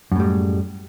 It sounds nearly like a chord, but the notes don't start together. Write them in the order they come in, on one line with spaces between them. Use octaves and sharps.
F#2 A2 G3 G#3